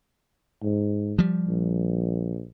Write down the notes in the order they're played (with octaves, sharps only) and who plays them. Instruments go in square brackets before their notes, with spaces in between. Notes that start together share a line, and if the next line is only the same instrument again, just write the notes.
[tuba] G#2
[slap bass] F3 G3
[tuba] A#1